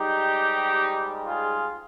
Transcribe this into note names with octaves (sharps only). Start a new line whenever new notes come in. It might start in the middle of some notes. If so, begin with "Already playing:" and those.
Already playing: G#2 G3 D#4 G4
F4 G#4